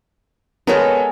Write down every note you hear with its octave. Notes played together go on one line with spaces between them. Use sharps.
G#3 B3 A4 A#4 C#5